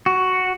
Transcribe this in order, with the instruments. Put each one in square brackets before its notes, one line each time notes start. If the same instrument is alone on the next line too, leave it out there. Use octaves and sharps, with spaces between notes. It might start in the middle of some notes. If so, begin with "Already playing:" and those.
[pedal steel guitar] F#4